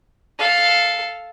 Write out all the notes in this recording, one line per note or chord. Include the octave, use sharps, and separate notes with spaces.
A4 F5